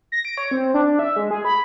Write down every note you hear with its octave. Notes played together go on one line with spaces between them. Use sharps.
A#6
D7
C#5
C4
D4
E5
G#3
G#4
B5